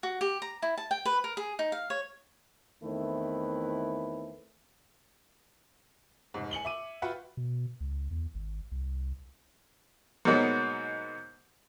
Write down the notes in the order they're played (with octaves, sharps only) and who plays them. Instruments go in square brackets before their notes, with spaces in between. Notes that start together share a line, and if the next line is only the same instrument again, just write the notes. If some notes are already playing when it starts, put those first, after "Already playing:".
[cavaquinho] F#4
G4
A#5
E4
A5
G5
B4
A#4
G#4
D#4
F5
C#5
[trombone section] E2 D#3 A3 C4 E4 B4
[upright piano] F1 G#2
G#5 C#7 F#7 G7
E5 D6 D#7
F4 F#4 B4 E5 F#5 G5
[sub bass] B2
C#2
E2
G#1
C2
[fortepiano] G#2 B2 F#3 A#3 B3 D#4